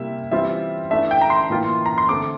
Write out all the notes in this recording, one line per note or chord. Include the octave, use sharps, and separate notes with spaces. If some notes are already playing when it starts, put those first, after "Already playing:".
Already playing: C3 G3 A#3 E4 E5
E3 G3 C4 F4 E5
E3 A3 D4 E5
G5
A#5
C6
A2 E3 A#3 F4
A#5
C6
D3 A3 C4 D6